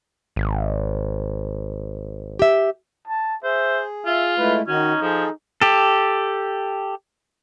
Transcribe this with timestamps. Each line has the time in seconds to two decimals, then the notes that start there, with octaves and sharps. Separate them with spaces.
0.36 G#1
2.39 G4 E5
3.07 A5
3.44 G#4 C5 E5
4.06 F4 E5
4.38 G#3 A3 E4 B4
4.68 D#3 C#4 D#4 F#4
5.02 F3 G#4 A4
5.61 G4 A4